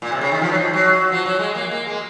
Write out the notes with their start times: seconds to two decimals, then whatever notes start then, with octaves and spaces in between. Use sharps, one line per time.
0.02 A#2
0.12 C3
0.21 C#3
0.32 D#3
0.41 F3
0.52 F#3
0.58 F3
0.73 F#3
1.12 F3
1.26 F#3
1.39 G#3
1.55 A#3
1.71 A#3
1.87 G#3